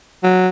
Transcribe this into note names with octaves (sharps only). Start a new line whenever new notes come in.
F#3